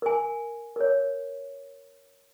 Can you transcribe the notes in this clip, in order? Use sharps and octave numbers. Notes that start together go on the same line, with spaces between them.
A#4 G#5
A#4 C#5